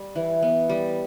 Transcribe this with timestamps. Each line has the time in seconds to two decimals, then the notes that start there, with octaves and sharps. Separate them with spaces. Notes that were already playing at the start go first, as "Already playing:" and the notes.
Already playing: G3
0.15 E3
0.42 B3
0.69 G3